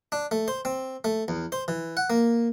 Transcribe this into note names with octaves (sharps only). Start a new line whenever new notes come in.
D4
A3
C5
C4
A3
E2
C5
E3
F#5
A#3